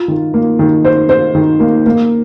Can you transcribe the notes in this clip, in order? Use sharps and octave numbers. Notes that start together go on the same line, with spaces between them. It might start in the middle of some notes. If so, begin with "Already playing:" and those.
Already playing: F4
D#3
A#3
D#3
C5
C5
D#3
A#3
A#3